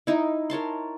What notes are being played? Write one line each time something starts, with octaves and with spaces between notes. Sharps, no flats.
D#4 E4
A#4 C#5 A5 C6